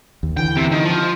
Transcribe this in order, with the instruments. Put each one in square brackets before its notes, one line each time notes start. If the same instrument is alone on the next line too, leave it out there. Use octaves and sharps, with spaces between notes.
[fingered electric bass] D#2
[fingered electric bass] D3 E3 [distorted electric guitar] G5
[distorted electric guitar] C3
D#3
F3